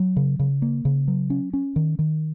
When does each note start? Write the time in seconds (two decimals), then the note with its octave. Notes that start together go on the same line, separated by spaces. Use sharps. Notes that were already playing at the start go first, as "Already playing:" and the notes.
Already playing: F#3
0.16 C#3
0.39 C#3
0.62 A#3
0.85 C#3
1.08 F#3
1.30 C#4
1.53 C#4
1.76 D#3
1.99 D#3